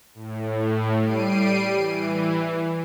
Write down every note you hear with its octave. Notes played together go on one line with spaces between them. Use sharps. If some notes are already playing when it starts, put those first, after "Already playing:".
A2
G3 C7 D7 D#7
E3